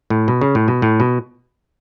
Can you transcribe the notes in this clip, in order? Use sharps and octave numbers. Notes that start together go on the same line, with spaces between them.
A2
B2
C#3
A2
B2
A2
B2